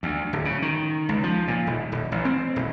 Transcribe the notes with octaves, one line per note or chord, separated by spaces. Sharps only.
D2
D1
C#3
D#3
C#2
F3
A#2
D#1
D#1
A1
C4
D#1